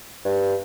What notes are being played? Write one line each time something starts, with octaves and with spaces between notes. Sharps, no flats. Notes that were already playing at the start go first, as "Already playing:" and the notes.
G2